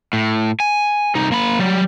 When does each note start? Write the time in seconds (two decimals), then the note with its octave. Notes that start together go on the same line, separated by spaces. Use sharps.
0.13 A2
0.60 G#5
1.15 C2 D#4
1.32 A#3 B5
1.59 F#3 G3